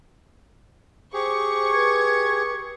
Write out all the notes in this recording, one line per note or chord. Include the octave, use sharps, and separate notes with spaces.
G4 G#4 C5 C#6
B4 G#6